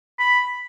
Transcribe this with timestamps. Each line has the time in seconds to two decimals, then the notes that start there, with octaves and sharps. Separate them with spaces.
0.19 B5